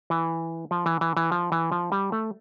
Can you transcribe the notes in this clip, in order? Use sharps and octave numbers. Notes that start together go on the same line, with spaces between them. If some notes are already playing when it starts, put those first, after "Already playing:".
E3
F3
E3
E3
E3
F3
E3
F3
G3
A3